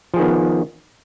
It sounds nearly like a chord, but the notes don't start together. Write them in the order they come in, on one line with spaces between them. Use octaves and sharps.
F3 G#4 D#3 B3